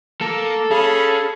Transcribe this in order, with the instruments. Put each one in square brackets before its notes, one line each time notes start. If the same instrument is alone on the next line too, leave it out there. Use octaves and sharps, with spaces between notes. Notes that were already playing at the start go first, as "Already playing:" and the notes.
[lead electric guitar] A#3 [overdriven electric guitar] A4
[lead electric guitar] C#4 [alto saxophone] G#4 [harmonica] F5 A5 B5